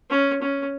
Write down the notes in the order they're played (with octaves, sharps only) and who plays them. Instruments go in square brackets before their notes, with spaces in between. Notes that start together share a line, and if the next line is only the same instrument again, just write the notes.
[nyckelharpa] C#4
C#4